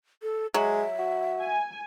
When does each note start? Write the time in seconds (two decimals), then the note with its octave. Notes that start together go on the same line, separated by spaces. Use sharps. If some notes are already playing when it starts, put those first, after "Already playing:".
0.23 A4
0.54 F#3 G#3 E5
0.99 F#4
1.40 G#5